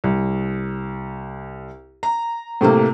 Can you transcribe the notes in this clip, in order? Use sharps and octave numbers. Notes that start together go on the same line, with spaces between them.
C2
A#5
A2 C3 A3 A#3